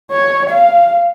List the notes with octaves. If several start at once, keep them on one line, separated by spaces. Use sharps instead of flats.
C#5
F5